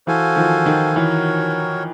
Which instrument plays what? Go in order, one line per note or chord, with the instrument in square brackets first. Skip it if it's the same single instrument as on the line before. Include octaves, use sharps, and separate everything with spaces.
[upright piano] E3 [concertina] F#4 A4 C5 F5 G#5
[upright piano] D#3 F3
D#3
[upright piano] E3 [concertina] F#4 A#4 C#5